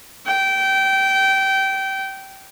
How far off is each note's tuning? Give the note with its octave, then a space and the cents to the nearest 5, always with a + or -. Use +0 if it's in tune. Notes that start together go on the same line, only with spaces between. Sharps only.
G5 -20